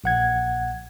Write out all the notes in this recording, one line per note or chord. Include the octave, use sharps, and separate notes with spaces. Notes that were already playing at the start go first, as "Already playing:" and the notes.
A#1 F#5 G#6